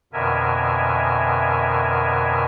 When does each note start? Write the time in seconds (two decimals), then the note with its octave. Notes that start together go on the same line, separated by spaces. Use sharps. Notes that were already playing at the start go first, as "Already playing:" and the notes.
0.13 F2 B2 D3 A#4 E5 G#5